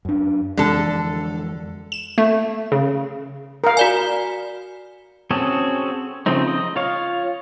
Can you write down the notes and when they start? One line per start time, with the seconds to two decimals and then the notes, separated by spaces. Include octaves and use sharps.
0.05 F#2 D4
0.57 F2 D3 E3 G#3 A4
1.92 E7
2.18 A3
2.72 C#3
3.64 A#4 F5
3.77 F#4 D5 G#5
5.31 C4 C#4 F#4 G#4 A4
6.26 C#3 F3 A3 C4 D#4
6.48 D#5
6.76 F4 C#5 F5